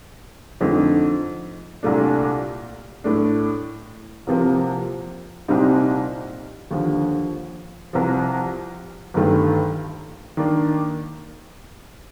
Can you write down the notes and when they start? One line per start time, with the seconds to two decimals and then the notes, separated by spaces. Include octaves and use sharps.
0.61 F2 D3 A3 D#4
1.83 C2 A#2 A3 D4
3.04 A2 A3 D4
4.27 C2 C3 F3 A#3
5.48 C2 A#2 G3 C4 D#4
6.71 D#2 D3 F3
7.93 C2 C3 F3
9.14 G1 G2 D#3 A3
10.37 D#3 A#3 D4